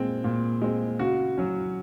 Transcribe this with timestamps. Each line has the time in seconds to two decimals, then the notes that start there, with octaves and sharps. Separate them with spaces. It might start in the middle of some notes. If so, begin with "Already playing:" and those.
Already playing: A#2 G#3 C4
0.24 A#2
0.62 G#3 C4
0.99 C#3 F#4
1.38 F#3 C#4